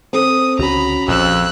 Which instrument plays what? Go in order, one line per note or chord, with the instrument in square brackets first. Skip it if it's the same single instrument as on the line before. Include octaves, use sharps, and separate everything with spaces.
[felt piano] C4 A4 [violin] D#6
[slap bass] C#2 D3 [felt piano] C#4 F#4 [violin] A#5 B5
[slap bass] A#1 D#3 F3 [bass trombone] F2 [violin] E6 F#6